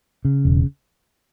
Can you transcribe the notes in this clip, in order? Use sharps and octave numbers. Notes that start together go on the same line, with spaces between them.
C#3
E1